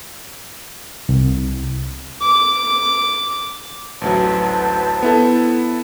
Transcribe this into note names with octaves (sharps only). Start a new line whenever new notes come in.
C2
D6
A1 D2 F#3 B4 C5 A5
B3 E4 A4